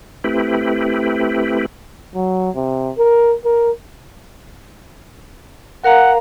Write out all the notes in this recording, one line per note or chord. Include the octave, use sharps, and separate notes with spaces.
A3 C4 E4 G4 B4
F#3
C3
A#4
A#4
A#4 F5 F#5 A#5